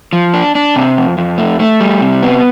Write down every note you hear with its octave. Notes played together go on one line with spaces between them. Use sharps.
F3
D4
D4
C3
F2
F2
A3
A3
G3
C3
B3